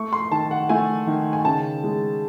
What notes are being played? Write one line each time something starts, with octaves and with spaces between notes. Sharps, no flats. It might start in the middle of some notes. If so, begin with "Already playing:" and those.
Already playing: A3 C#6
C6
D#3 A5
F#5
A3 G#5
D#3
G#5
C#3 A5
G#3